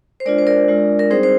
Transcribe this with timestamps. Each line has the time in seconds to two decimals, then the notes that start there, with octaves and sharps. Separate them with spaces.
0.20 C5
0.25 G#3 D4 F4 A#4 D5
0.38 C5
0.47 A#4 D5
0.68 G#3 D4 F4
0.99 A#4
1.10 G3 C4 D#4 G#4 C5
1.23 C5